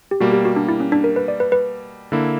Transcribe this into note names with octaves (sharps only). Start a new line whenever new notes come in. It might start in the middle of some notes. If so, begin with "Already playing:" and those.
G4
B2 G3 A#3 F#4
G4
F#4
D4
E4
C#4
D4
A#4
B4
D5
B4
B4
D3 A#3 E4